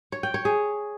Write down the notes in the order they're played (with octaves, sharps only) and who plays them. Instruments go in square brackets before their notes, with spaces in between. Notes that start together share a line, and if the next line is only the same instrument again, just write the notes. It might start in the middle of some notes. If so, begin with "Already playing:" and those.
[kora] C#5
G5
C#5
G#4